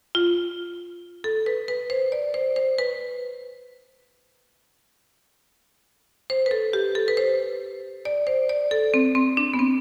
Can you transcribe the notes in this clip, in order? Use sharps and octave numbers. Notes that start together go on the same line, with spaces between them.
F4
A4
B4
B4
C5
D5
C5
C5
B4
C5
B4
A4
G4
A4
B4
C5
D5
C5
D5
A4
C4
C4
D4
B3
C4